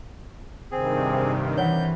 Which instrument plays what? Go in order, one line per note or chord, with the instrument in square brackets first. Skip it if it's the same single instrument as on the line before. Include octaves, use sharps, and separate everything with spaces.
[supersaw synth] G2 C3 D#3 [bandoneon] C4 G#4
[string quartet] E3 [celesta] C#5 F#5 [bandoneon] G6